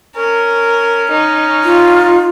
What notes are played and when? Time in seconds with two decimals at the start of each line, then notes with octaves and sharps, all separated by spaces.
0.17 C#4 A#4
1.10 D#4
1.64 F4